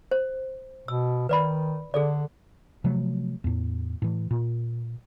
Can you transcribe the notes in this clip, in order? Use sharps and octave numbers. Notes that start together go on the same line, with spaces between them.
C5
B2 E6
D#3 B4 D5 B5
D3 G#4 A4 D5
C3 F3 F#3 A3
E2 A2
A2 E3
A#2